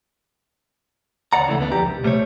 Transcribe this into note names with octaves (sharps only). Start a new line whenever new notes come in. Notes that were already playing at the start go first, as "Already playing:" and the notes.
D2 C#5 D5 F#5 A#5
C#3 E3 A3
D2 B3 D4
F2 G4 A#5
C2
B2 G3 A3 C5 C#5